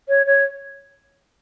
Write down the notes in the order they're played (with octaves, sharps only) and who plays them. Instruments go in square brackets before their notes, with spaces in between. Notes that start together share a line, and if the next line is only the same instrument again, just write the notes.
[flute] C#5
C#5